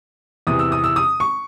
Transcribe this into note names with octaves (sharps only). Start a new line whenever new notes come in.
E2 C3 E3 D#6
E6
D#6
E6
D#6
C#6